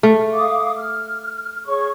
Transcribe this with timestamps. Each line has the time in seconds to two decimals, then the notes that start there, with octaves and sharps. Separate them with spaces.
0.03 A3
0.33 F5 D6 D#6
0.78 F6
1.66 G#4 C#5 C#6